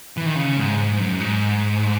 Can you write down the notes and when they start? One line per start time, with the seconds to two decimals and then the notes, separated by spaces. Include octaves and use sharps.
0.17 E3
0.26 D#3
0.36 C#3
0.57 G#2
0.78 G#2
0.93 G#2
1.00 F#2
1.20 G#2